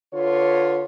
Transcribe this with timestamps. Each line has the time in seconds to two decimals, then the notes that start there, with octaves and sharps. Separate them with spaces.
0.12 D3 F4 B4 C#5